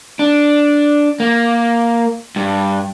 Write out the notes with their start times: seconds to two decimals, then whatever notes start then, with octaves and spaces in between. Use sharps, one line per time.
0.19 D4
1.20 A#3
2.36 G2